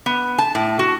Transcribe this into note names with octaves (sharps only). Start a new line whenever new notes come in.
B3
A5
A2
F#4